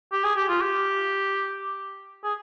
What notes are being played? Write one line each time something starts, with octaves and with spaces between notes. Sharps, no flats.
G4
G#4
G4
F4
G4
G#4